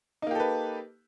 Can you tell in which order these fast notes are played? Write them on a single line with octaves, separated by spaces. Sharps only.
D#4 A#3 G4 A4 B4